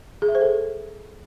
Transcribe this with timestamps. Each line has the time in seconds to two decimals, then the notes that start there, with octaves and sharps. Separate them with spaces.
0.22 G#4
0.28 E5
0.35 C5
0.41 A4